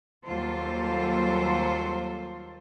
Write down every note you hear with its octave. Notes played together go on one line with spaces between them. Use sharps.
D#2 F#3 G3 F4 A4 C5